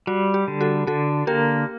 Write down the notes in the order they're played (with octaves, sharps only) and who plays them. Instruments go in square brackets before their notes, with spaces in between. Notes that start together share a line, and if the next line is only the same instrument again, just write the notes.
[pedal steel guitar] G3 [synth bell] F#4
[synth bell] G4
[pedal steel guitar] D3
[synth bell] F#4 A4
[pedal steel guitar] D3 [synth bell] F#4 A4
[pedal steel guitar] A#3 [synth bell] G4 A#4